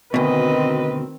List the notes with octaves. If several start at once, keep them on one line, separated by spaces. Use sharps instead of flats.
D2 B2 D#3 C4 B4 D#5